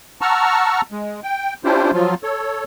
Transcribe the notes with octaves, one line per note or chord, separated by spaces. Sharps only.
F#5 A5 A#5 C#6 E6 F6
G#3
G5
C#4 D4 E4 F4 G4 C5
F3 F#3 F4
A4 C#5